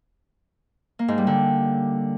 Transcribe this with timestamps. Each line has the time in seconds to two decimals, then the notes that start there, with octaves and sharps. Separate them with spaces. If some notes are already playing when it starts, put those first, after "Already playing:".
0.99 A#3
1.08 G#2
1.18 G3
1.27 D3